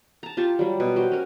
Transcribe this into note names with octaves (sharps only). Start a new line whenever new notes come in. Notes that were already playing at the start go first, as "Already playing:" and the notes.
A5 A#5
F4 G4 A5 C#6
F#3 G3
B2
F#4 G4 C5
C#4 A#4